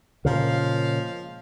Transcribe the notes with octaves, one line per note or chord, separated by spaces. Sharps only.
A#2 C#3 F3 G#3 F5